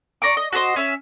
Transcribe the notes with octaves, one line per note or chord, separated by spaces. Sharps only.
D5 A#5 C#6 D6
D#5
F#4 A4 C5 D#5
C#4 E5